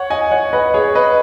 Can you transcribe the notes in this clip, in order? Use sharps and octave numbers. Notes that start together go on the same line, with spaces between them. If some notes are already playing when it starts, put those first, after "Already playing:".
Already playing: C#5 F#5
D#5 G#5
C#5 F#5
B4 D#5
G#4 C#5
B4 D#5